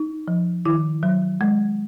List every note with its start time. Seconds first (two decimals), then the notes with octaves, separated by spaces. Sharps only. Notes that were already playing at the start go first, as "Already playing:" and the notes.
Already playing: D#4
0.28 F3
0.65 D#3 E4
1.03 F#3
1.41 G#3